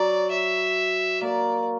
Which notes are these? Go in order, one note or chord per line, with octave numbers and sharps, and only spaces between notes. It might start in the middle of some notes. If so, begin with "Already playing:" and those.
Already playing: F#3 D5
E5
A#3 D5